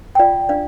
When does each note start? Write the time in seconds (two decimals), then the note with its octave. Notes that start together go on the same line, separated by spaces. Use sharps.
0.15 G5
0.19 F4 D5 F5
0.49 D4 D5 F5